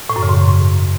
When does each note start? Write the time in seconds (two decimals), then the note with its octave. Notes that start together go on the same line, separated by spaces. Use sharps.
0.10 A2
0.16 F#2
0.23 C#3
0.29 G#2